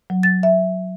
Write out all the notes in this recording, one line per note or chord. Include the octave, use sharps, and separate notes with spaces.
F#3
A6
E5